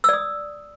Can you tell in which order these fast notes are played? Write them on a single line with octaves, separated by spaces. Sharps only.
E6 D5 D#6